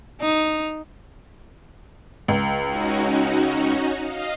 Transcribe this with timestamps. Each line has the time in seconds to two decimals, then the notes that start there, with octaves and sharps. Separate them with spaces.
0.21 D#4
2.28 C#2
2.66 C#4 D#4 F#4
3.97 D#5 F5